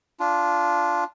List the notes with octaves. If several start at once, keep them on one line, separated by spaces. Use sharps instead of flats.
D4 F4